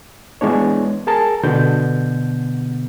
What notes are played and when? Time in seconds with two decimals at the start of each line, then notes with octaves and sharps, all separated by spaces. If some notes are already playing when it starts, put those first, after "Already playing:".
0.41 E3 G#3 B3 D4 C#5
1.07 G#4 A#4 A5
1.44 B2 D3 B3 G6